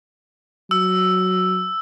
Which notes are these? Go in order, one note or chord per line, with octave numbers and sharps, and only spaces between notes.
F#3 E6